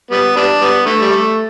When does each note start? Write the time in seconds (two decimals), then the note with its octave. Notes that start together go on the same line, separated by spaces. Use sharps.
0.11 G3 B3
0.36 G3 B3 D4
0.61 G3 B3
0.86 D3 A3
1.00 G3
1.11 A3